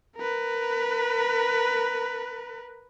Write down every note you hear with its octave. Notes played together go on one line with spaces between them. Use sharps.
A#4 B4